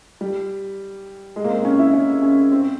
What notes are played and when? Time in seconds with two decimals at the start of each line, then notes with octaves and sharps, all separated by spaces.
0.21 G3
1.36 G#3
1.44 A#3
1.50 C4
1.65 C#4
1.79 E4
1.93 C#4
2.22 C#4
2.52 C4